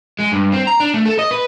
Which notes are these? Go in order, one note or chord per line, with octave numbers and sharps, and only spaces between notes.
G#3
G2
C4
A#5
D4
A3
A4
D#5
B4